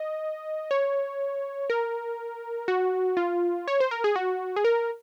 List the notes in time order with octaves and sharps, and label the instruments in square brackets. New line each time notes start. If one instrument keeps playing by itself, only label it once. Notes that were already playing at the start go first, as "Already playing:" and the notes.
Already playing: [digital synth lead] D#5
C#5
A#4
F#4
F4
C#5
C5
A#4
G#4
F#4
G#4
A#4